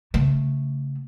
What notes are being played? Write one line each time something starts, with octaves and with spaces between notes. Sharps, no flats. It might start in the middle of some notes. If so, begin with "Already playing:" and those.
C#3 A3